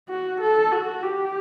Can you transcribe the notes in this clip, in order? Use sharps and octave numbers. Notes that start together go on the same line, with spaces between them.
F#4
A4
F#4
G4